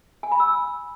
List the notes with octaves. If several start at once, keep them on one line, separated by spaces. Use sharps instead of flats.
G#5
B5
E6